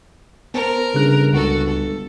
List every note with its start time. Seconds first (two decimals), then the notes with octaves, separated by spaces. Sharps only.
0.54 B3 A#4 C5 A5
0.94 G1 C#3 F#6
1.33 C#2 F#4 A4
1.67 A4